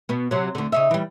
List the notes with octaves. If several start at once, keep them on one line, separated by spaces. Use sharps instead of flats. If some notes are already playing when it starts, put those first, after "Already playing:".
B2 B3
C3 F#3
D2 D3
C#3 D#4 E5
E3 G3